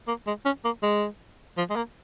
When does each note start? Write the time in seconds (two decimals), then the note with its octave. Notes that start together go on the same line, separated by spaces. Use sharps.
0.08 A#3
0.27 G#3
0.45 C#4
0.65 A#3
0.83 G#3
1.57 F3
1.70 G#3
1.76 A#3